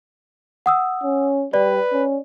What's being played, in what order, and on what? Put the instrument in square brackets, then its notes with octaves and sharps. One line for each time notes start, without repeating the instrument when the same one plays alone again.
[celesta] F#5 D#6 E6
[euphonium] C#4
[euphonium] G3 [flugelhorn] B4 [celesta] D5
[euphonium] C#4